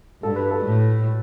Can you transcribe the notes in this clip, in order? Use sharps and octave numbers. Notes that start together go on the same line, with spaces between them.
G2 A4
B4
A4
A2